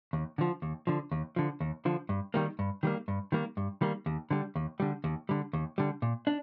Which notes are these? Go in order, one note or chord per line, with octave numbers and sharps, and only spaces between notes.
D#2
D3 F3
D#2
D3 F3
D#2
D3 F3
D#2
D3 F3
G2
D#3 G3 A#3
G2
D#3 G3 A#3
G2
D#3 G3 A#3
G2
D#3 G3 A#3
D#2
D3 G3
D#2
D3 G3
D#2
D3 G3
D#2
D3 G3
A#2
D4